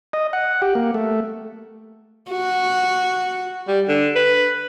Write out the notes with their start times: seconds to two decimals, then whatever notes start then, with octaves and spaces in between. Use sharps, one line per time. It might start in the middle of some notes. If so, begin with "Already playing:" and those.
0.13 D#5
0.33 F#5
0.62 G4
0.75 A#3
0.94 A3
2.31 F#4
3.68 G3
3.88 D3
4.16 B4